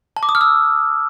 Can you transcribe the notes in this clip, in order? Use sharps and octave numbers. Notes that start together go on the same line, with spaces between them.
A5
D6
D#6
F6
E6